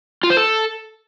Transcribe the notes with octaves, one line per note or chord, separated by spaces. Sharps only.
F4
C5
A4